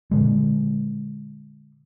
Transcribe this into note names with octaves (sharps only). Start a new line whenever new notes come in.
A#2 D3 G#3